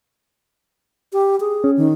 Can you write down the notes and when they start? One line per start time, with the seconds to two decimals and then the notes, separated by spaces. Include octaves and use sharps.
1.13 G4
1.40 G#4
1.64 C#4
1.77 D#3